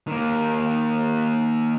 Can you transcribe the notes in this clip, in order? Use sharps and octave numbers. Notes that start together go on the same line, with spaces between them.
D#3 A#3